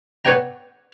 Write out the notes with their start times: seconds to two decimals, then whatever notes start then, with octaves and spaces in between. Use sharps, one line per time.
0.25 B3 B4 C#5 D5 G5 A#5